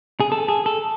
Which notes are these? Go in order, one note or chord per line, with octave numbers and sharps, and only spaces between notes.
G#4
A4
G#4
A4